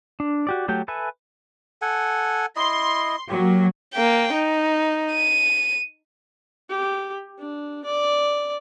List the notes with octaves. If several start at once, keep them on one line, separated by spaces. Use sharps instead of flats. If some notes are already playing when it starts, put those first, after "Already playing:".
D4
F#4 G4 D5
F#3 A3 G4 G5
A4 B4 E5 G#5
A4 F#5 G#5
E4 D#5 C6
F#3 A#3 G4
A#3 G5
D#4
D#7
G4
D4
D5